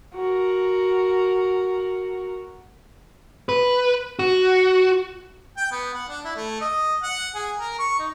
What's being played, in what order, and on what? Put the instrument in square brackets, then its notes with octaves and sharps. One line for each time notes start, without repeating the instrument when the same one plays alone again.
[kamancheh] F#4 A#4
[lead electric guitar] B4
F#4
[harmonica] G5
B3
F#5
D4
E4
A3
D#5
F#5
G#4
A#4
C#6
D#4